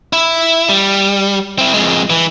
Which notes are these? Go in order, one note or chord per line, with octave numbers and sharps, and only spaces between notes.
E4
G3
C4 E4
F2 G#3
E3